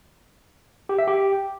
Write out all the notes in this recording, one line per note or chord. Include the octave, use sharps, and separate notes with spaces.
G4
E5
G4